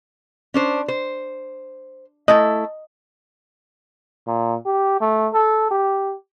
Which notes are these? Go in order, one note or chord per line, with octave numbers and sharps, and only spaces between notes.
C#4 D4 C5
C5
A3 E4 A4 D#5
A#2
G4
A3
A4
G4